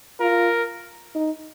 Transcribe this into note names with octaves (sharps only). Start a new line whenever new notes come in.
F4 A#4
D#4